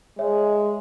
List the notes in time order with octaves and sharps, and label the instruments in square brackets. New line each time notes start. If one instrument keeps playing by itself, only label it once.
[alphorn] G#3 [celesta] C#5 E5